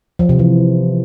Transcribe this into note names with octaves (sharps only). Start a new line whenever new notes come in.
F3
C3
E3